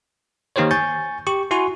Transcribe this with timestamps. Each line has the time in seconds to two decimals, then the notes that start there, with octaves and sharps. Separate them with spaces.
0.56 D#3 A#3 D#4 G4 C5 C#5
0.71 G#5 C#6 G6 A6
1.27 G4 C#6
1.51 E4 F#4 G#5 C6 C#6